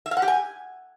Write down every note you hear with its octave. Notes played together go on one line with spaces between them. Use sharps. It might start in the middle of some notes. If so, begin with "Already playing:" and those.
E5
F5
F#5
G4
G#5